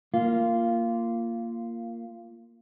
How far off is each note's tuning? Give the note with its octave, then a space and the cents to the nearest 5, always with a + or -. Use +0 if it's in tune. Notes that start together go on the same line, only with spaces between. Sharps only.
A#3 -5 F4 -15